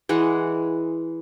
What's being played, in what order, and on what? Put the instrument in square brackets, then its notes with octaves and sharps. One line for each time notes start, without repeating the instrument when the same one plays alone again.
[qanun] E3 G#3 F#5